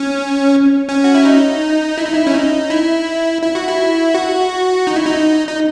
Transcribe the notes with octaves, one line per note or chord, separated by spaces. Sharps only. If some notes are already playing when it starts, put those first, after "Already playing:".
Already playing: C#4
C#4
F#4
E4
D#4
E4
D#4
E4
C#4
D#4
E4
E4
F#4
E4
F#4
D#4
E4
D#4
D#4